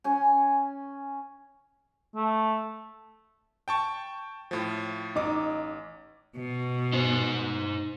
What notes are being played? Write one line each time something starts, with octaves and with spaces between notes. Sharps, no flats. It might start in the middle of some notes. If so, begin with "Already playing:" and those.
C#4 G#5
A3
G5 A5 C#6
A2 F3
A1 D#4 D6
B2
D#4 C5